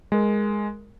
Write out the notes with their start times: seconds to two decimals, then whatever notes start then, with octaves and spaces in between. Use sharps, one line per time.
0.12 G#3 A#4